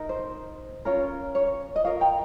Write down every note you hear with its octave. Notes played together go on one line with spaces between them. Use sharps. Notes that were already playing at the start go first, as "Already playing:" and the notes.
Already playing: D#4 A#4
C5
C#4 F4 A#4 C#5
C#5
D#5
F4 A#4 C#5 F5
G5 A#5